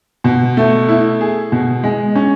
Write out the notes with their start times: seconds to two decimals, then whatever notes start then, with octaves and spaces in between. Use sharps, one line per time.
0.24 B2
0.57 A3
0.88 E4
1.21 G#4
1.52 B2
1.84 G#3
2.15 C#4